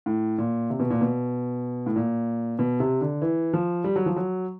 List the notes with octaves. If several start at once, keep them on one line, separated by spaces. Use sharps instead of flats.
A2
A#2
C3
B2
A#2
B2
A2
A#2
B2
C3
D3
E3
F3
G3
F#3
F3
F#3